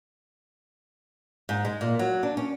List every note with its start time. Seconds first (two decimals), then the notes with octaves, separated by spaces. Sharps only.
1.49 G#2
1.65 G#3
1.81 A#2
1.99 F#3
2.23 D4
2.37 C#4